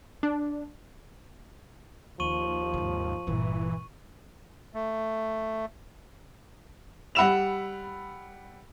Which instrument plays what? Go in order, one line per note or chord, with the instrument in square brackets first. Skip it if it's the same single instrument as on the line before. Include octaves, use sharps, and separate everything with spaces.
[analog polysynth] D4
[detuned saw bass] D#2 [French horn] F3 [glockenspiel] C#6 D#7 F#7
[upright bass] G#2 C3
[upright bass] G1 A#2 [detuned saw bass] E3
[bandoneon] A3
[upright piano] G3 F#5 B5 E6 E7 F7